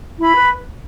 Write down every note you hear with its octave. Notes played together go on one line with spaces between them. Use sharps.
E4 B5
B4